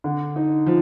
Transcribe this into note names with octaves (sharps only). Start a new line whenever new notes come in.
D3
D#4
F3